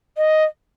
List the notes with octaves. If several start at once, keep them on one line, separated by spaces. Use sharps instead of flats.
D#5